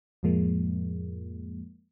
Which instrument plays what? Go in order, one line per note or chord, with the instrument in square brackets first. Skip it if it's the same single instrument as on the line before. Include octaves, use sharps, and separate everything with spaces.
[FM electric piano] F2 A2 F3 G#3 A#3